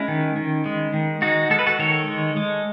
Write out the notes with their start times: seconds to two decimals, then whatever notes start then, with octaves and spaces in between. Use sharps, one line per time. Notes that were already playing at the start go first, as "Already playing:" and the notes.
Already playing: G#3 C#4 E4
0.08 D#3
0.36 D#3
0.66 G#3
0.94 D#3
1.22 G#3 D#4 F#4
1.50 G#3 A4
1.59 B4
1.67 F#4 A4
1.79 D#3 A4 C#5
2.08 G#3
2.37 G#3